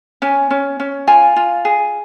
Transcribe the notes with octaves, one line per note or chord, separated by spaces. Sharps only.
C#4 G#5
C#4
C#4
F4 G#5
F4
G#4